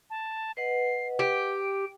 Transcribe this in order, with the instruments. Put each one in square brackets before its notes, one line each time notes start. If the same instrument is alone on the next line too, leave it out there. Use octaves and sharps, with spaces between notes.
[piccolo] A5
[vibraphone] B4 D#5 F#5 [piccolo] C7
[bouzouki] G4 [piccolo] D7